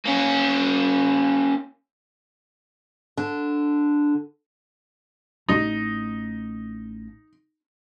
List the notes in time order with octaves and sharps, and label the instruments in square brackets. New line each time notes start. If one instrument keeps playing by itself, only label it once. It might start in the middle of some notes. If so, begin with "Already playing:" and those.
[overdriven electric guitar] A#3 C#4
[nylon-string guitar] D3
[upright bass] A1 A3 [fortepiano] D#4